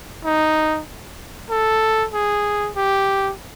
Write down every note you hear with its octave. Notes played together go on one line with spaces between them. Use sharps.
D#4
A4
G#4
G4